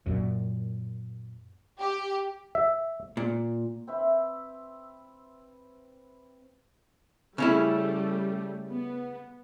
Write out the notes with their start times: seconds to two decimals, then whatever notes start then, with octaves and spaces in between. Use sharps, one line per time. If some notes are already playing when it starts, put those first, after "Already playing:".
0.06 F#2 A#2
1.80 G4
2.55 E5
3.17 A#2
3.87 C4 B4 E5
7.38 C#3 G3 A3 C#4 E4
8.70 B3